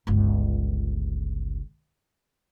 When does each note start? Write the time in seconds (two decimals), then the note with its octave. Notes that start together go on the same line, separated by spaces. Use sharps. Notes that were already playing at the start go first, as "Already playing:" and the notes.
0.07 G1 C#2